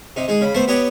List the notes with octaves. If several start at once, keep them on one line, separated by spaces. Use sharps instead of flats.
C3 D#4
G#3 D#4 G#4
C#3 B5
A3 B3 C5 A5
B3 G4 C#5 D#5 F#5 G5